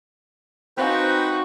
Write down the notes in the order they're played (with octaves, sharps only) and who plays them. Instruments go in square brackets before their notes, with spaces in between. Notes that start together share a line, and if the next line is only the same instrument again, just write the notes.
[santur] C4 F5 G#5 [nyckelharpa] D#4 F#4 [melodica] B4 C5 G5